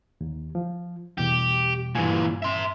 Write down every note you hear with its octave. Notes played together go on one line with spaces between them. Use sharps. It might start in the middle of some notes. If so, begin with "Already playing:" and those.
D#2
F3
E2 B2 G3 G4
G2 A#2 E3 G#5
E5 C6